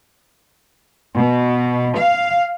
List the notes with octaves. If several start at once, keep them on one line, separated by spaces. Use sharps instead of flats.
B2
F5